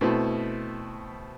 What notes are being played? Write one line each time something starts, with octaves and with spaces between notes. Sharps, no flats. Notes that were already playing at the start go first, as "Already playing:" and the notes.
B2 A3 C4 E4